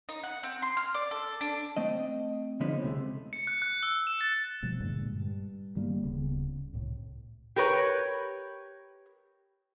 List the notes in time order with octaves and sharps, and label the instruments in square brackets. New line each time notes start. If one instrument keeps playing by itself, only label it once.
[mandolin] D#4
F#5
C4
C6
F6
D5
A4
D4
[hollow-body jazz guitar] A3 C4 D#5
D3 F3 G#3 B3 C#4 D#4
C#2 C3 G#3 A3
[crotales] C#7
F#6
F#6
E6
E7
A6
[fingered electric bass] B2 F3 G3 A3
G2 A#2 D3 G#3
G2
D#3 G3 A3 A#3
D1 C#3 B3
C2 A2 C3
[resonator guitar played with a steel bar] G4 A#4 B4 C#5